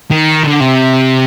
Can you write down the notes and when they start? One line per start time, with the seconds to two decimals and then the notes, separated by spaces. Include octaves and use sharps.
0.11 D#3
0.43 D3
0.60 C3